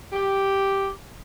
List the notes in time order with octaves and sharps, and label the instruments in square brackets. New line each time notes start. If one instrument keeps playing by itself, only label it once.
[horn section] G4